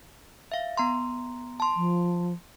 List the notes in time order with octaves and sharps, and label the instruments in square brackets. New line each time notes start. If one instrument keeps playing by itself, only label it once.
[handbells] E5 F5
B3 A#5 C6
A5 C6
[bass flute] F3